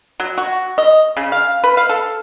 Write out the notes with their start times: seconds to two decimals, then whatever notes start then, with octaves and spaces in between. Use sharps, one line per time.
0.20 F#3
0.38 F#4
0.78 D#5
1.17 C#3
1.32 F5
1.64 B4
1.77 F5
1.89 A4